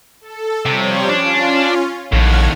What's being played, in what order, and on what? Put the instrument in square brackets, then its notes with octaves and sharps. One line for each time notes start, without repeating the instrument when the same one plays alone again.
[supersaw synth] A4
[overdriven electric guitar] C3 [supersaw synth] F3 G3 C#5
[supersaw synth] C#4 F4 [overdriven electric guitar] D4
[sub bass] A#1 [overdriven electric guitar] D#2 A2 [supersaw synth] F#5 F6 G#6